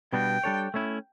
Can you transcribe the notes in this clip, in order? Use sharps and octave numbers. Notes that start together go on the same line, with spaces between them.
B2 G3 B3 D4 F#4 G5
G3 D4 A4 C#5
A3 C#4 E4